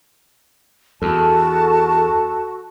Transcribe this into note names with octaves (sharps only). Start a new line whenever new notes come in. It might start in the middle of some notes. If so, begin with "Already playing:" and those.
E2 F#4 A4 A5